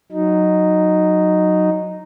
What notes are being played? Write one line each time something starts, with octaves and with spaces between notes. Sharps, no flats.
F#3 D#4